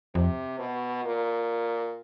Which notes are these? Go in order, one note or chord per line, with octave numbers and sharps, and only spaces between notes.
F2 C3
B2
A#2